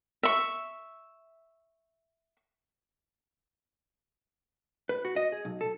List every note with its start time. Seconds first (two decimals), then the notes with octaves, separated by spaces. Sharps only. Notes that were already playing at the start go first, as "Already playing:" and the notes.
0.23 E5 C#6
4.89 B4
5.05 F#4
5.16 D#5
5.32 G#4
5.45 B1
5.61 A4